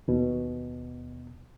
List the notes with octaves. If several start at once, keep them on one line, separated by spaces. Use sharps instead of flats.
D#2 B2